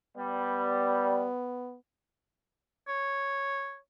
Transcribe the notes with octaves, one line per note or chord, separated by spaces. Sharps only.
G3 B3
C#5